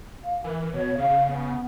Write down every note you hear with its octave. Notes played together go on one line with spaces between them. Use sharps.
F5
E3 A#4
B2 C#5
C#3 F5
B3